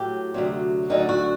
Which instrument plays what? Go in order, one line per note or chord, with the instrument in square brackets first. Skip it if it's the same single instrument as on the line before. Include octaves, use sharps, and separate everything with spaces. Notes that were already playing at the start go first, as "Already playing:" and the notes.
Already playing: [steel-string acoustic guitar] A2 F#3 G4
D2 C3 F#3
D2 D3 F#3 D#4
F#4